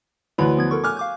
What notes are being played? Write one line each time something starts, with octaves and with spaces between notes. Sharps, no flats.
D2 E3 B4 C#5 B5
F3 B3 G#6
A4 A#4 C#6
G#5 D6 F6 F#6
F5 D6 G6